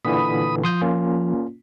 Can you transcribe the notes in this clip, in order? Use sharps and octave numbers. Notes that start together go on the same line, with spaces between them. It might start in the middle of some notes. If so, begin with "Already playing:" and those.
A#2 D3 E3 B5 D#6
F3 C6 D#6 G6
A#3 C#4 F4